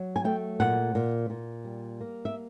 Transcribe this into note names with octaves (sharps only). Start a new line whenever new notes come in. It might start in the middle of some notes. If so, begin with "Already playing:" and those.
Already playing: F#3
G#5
A3 G5
A#2 F#5
A#2
A#2
G3
A#3
E5